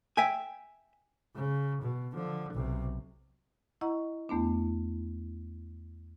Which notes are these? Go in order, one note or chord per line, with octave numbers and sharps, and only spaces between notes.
E5 G5 G#5
C#3
B2
D3 F3
B1 C3
E4 D#5 F#5 A#5 C#6
E2 A3 B3 D4